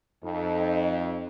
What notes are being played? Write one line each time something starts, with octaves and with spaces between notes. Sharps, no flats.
F2 D#4